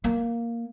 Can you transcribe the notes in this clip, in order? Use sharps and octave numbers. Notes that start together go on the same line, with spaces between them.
A#3